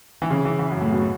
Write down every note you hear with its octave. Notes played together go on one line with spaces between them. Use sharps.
E3
C#3
E3
E3
F#2
A2
B2